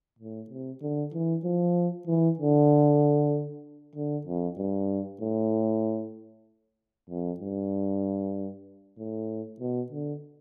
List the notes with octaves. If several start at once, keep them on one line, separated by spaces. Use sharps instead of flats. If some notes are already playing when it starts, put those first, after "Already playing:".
A2
C3
D3
E3
F3
E3
D3
D3
F2
G2
A2
F2
G2
A2
B2
D3